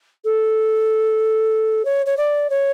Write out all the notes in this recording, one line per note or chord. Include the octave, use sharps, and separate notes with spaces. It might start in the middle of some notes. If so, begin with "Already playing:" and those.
A4
C#5
C#5
D5
C#5